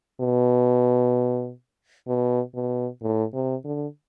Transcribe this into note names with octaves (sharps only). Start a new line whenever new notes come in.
B2
B2
B2
A2
C3
D3